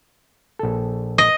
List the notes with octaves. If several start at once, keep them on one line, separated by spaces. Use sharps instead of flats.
A#1 A4
D#5